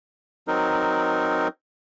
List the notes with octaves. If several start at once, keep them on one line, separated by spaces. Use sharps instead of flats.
F#3 C4 D#4 A#4